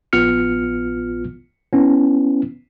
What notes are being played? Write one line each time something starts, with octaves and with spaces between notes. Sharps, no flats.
A#1 B3 F4 F6 C#7
B3 C#4 E4